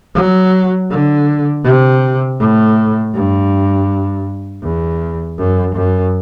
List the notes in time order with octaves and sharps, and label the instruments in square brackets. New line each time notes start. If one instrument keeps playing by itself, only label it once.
[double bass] F#3
D3
C3
A2
G2
E2
F#2
F#2